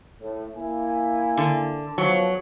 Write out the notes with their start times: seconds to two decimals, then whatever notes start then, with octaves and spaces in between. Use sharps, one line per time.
0.21 A2
0.56 A#3 E4 G#5
1.37 D3
1.98 F3 F#3 B3